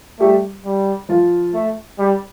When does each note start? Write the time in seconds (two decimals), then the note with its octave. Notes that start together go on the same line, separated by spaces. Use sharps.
0.20 G3 A3 G4
0.65 G3
1.09 F3 F4
1.54 A3
1.99 G3